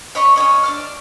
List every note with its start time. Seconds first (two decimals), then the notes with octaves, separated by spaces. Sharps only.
0.15 C#5 D#5 B5 C#6
0.36 C#4 G4 C#5 D#5
0.63 D4 D6 F6